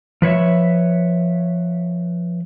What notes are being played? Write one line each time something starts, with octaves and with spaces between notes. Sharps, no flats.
F3 B4 C#5 E5